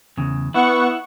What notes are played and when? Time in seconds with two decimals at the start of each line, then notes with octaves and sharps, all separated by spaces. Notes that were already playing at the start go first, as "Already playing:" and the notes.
0.17 E2 C#3
0.54 B3 E4 F#5 C#6